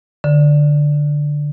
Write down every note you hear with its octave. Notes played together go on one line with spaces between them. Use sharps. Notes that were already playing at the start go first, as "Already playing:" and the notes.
D3